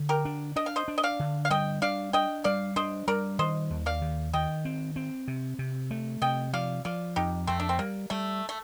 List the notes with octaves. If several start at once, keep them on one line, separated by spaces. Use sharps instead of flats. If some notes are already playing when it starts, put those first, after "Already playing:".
Already playing: D3
G4 A#4
D4
D4 D#5
F5
C5 D#5
D4
D#5
D5 F5
D3
F5
G3 D#5 G5
D4 D5 F5
D4 D#5 G5
G3 D5 F5
D4 C5 D#5
G3 A#4 D5
D#3 C5 D#5
D#2
D5 F5
D#3
D#3 D#5 G5
C4
C4
C3
C3
A3
C3 D#5 G5
F3 D5 F5
F3 D5 F5
F2 D#4 G4
F2 A3 C4
D4
C4
G3 A#3
G3 A3
A3